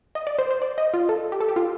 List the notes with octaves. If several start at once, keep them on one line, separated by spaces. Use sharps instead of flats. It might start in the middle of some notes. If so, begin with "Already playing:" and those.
D#5
D5
C5
C5
D5
D#5
F4
A4
G4
A4
G4
F4